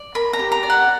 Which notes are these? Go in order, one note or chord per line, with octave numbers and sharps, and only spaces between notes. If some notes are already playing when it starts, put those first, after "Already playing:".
Already playing: D5
A#4 B5
A#5
G4
A#5
D5
F#5